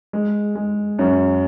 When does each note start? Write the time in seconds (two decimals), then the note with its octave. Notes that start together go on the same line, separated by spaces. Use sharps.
0.13 G#3
0.55 G#3
0.99 F#2